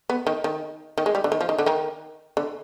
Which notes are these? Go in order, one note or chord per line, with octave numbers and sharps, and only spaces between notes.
B3
D#3
D#3
D#3
G#3
G3
D3
D#3
F3
D#3
D3
D#3
D3